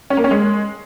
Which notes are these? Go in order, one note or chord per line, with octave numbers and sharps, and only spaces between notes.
C#4
A#3
C#4
G#3